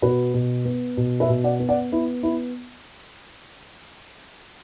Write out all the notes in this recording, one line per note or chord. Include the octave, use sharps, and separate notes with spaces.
B2 F#4 B4
B2
B3
B2
B4 E5
B2
D5 F#5
B3
D5 F#5
B3 E4
B3 E4